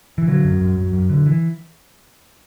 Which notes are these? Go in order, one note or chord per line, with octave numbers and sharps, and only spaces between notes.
E3
D3 F#3
F#2
F#2
F#2
F#2
D3
E3